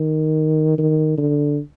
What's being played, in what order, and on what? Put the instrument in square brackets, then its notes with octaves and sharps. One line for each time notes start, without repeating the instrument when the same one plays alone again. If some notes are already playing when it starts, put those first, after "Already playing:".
Already playing: [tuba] D#3
D#3
D3